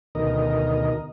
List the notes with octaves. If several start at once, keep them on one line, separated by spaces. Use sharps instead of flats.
D2 B2 D#3 A#4 D#5